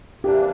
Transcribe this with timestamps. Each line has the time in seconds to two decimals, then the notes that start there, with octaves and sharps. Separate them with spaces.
0.24 C3 E3 G3 A#3 D4 G4